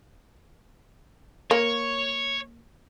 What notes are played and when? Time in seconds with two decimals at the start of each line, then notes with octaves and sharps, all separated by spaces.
1.51 A#3 C#5